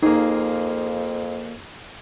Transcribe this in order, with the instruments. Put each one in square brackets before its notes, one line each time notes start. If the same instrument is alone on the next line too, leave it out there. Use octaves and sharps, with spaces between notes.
[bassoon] F2 [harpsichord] A#3 G#4 [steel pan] D#4